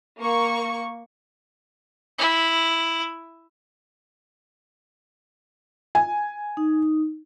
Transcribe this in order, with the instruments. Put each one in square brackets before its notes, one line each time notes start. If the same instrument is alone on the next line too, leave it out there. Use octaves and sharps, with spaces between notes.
[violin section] A#3 C#6
[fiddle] E4
[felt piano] G#5
[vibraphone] D#4